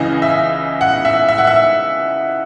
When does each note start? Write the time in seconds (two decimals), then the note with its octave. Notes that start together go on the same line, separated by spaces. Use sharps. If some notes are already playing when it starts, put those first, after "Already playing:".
Already playing: C#2 C#3 E3 D#5
0.22 E5
0.81 F#5
1.05 E5
1.28 E5
1.38 F#5
1.47 E5